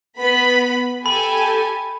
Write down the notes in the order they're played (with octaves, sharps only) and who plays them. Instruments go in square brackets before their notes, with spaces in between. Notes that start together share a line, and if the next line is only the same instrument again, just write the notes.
[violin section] B3 B5
[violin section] G4 A4 G#5 [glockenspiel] B5